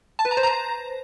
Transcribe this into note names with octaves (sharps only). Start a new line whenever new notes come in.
A5
B4
A#5
C5
A#5